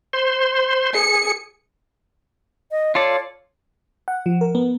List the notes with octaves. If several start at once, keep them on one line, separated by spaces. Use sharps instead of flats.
C5 C6
G#4 C#7
D#5
F4 A4 C#5 D5
F#5
F3
A#4
B3